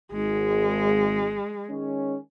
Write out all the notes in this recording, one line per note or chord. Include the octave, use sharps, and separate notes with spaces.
G#1 G#3
D#3 G#3 C#4